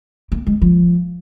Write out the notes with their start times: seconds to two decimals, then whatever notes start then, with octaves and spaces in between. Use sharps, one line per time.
0.32 A#3
0.47 G#3
0.62 F3